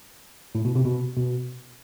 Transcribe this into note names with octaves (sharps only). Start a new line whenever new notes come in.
A2
B2
C3
B2
B2